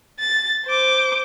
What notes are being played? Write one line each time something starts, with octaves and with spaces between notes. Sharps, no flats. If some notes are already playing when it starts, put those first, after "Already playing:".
A6
C5 D6